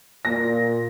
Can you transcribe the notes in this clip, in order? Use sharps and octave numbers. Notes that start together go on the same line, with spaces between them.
A#2 A#6